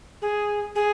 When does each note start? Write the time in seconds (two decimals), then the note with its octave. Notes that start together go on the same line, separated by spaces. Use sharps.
0.22 G#4
0.75 G#4